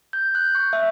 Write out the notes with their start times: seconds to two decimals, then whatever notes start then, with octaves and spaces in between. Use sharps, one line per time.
0.13 G6
0.35 F#6
0.55 C#6
0.73 E5